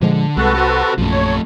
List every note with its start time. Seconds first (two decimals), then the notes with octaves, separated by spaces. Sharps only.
0.01 A#2 D3 F3 G#3
0.37 C2 G#3 F#4 A4 B4
0.55 G4 C5
0.98 A#1 F#2 F3 A3
1.11 C#5